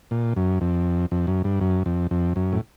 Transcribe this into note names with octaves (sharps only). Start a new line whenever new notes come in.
A#2
F#2
F2
F2
F#2
G2
F#2
F2
F2
F#2
A2